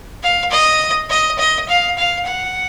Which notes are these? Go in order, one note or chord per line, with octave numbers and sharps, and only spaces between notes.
F5
D#5
D#5
D#5
F5
F5
F#5